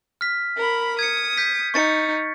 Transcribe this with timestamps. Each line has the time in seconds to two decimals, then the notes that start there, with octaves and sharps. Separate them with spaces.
0.21 F6 B6
0.57 A#4 B5
0.99 D#6 G#6 C#7
1.38 G6 B6
1.74 D#4 C#6 A6 C#7